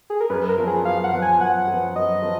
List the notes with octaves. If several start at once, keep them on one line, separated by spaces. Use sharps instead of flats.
G#4
A#4
F#2 B4
A#4
F3 B3
G#4
F#2 F5
F#5
F3 B3
G#5
F#2 F#5
F3
B3
F#2 D#5
F3 B3